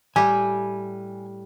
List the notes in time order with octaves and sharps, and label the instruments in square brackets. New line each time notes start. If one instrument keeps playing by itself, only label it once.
[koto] A2 G3 G4 [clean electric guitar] G#5